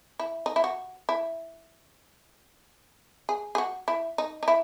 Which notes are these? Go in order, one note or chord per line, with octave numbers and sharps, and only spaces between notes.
E4
D#4
E4
F#4
E4
G#4
G#4
F#4
E4
D#4
D#4
E4